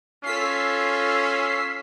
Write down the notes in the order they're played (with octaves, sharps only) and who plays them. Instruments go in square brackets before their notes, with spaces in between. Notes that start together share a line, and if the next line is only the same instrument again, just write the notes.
[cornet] C#4 [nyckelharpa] F4 A4 [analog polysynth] E6 B6 C7